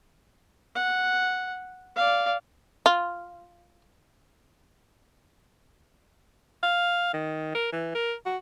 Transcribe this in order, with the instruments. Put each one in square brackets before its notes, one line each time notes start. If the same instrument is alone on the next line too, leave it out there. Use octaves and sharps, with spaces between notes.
[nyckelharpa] F#5
D5 F5
[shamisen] F4
[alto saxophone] F5
D#3
A#4
E3
A#4
F#4